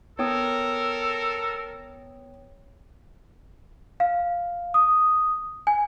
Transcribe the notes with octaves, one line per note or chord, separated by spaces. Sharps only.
B3 A4 A#4 C#5 G5 D#6
F5
D#6
G#5